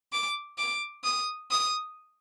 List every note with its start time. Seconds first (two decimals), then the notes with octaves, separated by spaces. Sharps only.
0.12 D6
0.58 D6
1.04 D#6
1.51 D#6